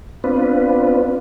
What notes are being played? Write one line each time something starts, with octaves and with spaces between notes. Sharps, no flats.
B3 C4 D4 F4 B4